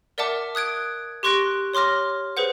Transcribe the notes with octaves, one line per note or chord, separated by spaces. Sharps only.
A#4 D5 E5 F#5 A5 D6
D#6 F#6 G#6 D7
G4 C6 C#6 F#6 A#6 D7
C#5 C6 D6 F6 A#6
G#4 B4 C5 F#5